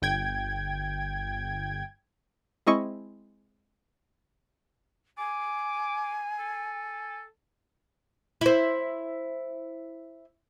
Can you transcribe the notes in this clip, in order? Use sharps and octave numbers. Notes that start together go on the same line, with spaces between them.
G1 G5 G#6
G#3 C4 E4 D#5 C#6
G#5 D6
A4
E4 C5